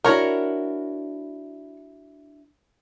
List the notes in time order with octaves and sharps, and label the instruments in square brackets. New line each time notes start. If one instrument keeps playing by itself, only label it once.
[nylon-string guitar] D4 E4 F#4 [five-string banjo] A#4 C#5